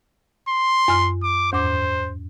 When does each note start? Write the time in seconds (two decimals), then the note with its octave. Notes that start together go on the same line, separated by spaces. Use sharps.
0.49 C6
0.88 F#2 F6
1.23 D6
1.53 E2 G#2 C5 D6